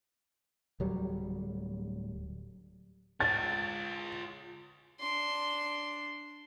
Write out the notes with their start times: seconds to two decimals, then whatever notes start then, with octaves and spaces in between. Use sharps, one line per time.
0.80 D1 F#3 G3
3.20 F4 C#5 A6
5.00 D4 C6